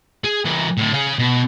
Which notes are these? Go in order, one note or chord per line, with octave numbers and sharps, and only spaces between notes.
G#4
E3 A#4
A2 D3
G#4 F5
B2